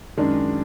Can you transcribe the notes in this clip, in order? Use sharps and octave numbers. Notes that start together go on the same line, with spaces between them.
F#2 D#3 G#3 D4